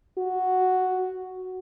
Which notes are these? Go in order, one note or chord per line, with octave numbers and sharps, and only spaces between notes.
F#4